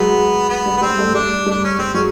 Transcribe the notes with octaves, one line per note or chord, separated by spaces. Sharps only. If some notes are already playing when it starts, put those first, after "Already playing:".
Already playing: F#3 G#3 B3
B3
G3
B3
G3 C4
G3 A3
G3 D4
G3 D4
C#4
G3 C4
F#3 G#3 C#4